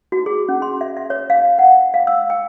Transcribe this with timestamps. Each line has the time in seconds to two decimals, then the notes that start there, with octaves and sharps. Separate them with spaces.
0.12 F#4
0.26 G#4
0.49 C#4
0.62 C6
0.81 E5
0.97 E5
1.10 C#5
1.30 F5
1.59 F#5
1.94 F5
2.07 E6
2.30 G5